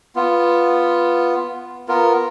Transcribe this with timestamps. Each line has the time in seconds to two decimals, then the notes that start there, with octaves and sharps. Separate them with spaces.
0.16 B3 F4
1.88 B3 F4 A#4